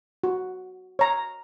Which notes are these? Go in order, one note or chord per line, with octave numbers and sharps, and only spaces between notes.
F#4
C#5 A#5